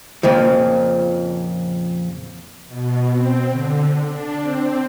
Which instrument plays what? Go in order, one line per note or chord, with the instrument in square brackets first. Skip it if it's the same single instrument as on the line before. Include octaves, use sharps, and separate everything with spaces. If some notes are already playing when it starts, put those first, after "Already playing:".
[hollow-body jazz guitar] F2 A#2 C#3 F3
[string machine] B2
C4
D3
D4
C4